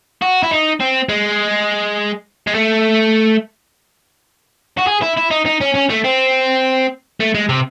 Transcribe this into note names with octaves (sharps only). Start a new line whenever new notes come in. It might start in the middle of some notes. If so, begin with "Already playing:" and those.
F#4
E4
D#4
C4
G#3
G#3
A3
F#4
G#4
E4
E4
D#4
D#4
C#4
C#4
A3
C4
A3
G#3
C3